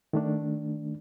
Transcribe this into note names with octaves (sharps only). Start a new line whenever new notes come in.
D#3 A3 D4